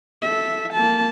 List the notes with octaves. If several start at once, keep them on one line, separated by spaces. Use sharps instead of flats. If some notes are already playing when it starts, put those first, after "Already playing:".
A4 E5
A#3 A5